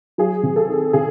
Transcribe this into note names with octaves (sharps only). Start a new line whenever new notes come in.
F#3 G#4
C3
A4
D#3
C3 G#4